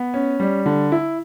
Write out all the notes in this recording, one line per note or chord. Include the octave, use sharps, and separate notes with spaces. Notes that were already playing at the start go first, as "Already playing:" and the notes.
Already playing: B3
C#4
G3
D3
E4